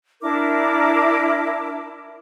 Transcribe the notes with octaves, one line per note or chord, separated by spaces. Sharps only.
D4 E4 A#4 D6